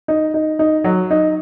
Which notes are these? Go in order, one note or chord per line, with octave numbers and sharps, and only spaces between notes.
D#4
D#4
D#4
F#3
D#4